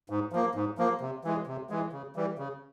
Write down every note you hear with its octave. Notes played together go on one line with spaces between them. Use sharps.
G#2
F3 A#3
G#2
F3 A#3
C3
E3 G#3
C3
E3 G#3
C#3
E3 G3
C#3